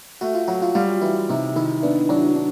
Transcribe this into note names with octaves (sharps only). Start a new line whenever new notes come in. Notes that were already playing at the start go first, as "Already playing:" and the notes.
A3 F#4
F4
F#3 F#4
F4
G3 F4
E3 E4
C3 D#4
D#3 E4
B3 D4
F#3 D4
D4